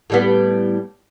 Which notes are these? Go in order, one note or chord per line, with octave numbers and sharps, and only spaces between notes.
A2 G3 B3